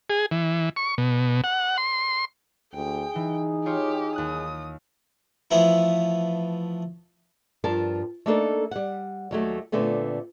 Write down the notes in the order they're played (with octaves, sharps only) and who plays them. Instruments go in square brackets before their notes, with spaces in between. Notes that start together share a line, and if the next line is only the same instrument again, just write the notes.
[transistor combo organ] G#4
E3
C#6
B2
F#5
C6
[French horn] D2 [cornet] G#4 [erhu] G5
[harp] E3 [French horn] D#4
[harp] F4 C#5 G5 [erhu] G4
[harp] D#2 F#6 [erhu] D#6
[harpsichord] E3 F3 A3 B3 E4
[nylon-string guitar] G2 F3 A#4 A5
A3 A#3 D4 D#4 A4 A#4
G3 F#5
D#2 F#3 A3
A#2 D3 A3 B3 C4